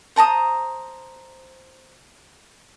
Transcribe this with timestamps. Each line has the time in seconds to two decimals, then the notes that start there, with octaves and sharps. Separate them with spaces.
0.16 C5 A5 A#5 D#6